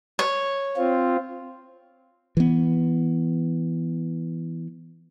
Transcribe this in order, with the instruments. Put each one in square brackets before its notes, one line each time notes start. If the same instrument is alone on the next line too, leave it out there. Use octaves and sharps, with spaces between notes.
[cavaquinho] C#5
[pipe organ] C4 F4
[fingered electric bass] E3 B3